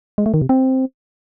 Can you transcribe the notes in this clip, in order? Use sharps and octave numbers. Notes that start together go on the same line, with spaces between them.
G#3
A3
D#3
C3
C4